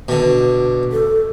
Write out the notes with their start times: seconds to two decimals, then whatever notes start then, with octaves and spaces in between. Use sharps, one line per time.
0.08 B2 D3
0.92 A4